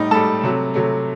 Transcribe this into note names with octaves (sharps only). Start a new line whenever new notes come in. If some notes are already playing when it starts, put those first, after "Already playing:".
Already playing: A2 G3 D#4 D#5
A2 G3 A4 A5
C3 F#3 A3
C3 F#3 A3